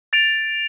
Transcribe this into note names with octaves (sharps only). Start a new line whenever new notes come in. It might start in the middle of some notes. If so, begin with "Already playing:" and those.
A6 D7 F7